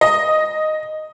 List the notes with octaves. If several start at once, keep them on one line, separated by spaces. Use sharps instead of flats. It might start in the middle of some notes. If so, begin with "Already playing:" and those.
D#5